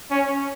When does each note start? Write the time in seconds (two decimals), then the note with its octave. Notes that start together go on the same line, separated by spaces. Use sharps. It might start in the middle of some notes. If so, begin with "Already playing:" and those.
0.11 C#4